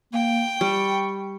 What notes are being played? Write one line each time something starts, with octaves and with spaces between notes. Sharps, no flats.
A#3 G5
G3 C#6